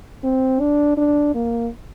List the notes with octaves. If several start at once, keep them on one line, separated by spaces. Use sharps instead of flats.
C4
D4
D4
A#3